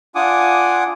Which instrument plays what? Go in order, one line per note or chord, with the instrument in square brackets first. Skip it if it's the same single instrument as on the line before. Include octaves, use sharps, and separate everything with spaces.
[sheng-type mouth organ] D4 F4 F#5 G#5 D6 D#6